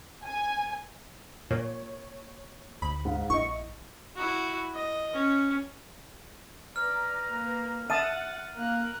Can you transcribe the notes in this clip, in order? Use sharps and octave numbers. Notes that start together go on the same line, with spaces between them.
G#5
A#2 C#5
D2 B5
G#2 F5
A#1 E4 D#5 C#6
E4 F#4
D#5
C#4
B4 D5 A#5 F6
A#3
E5 F#5 A5 D#6 A6 D#7
A#3 A#4 F#6